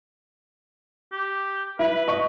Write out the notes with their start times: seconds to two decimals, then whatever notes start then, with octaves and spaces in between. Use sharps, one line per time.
1.12 G4
1.79 E4 B4
2.08 D#5 C#6